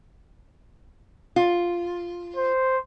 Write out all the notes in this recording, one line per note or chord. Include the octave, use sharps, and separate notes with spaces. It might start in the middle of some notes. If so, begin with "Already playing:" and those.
F4
C5